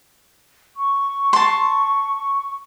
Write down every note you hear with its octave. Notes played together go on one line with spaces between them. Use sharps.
C#6
A5 C6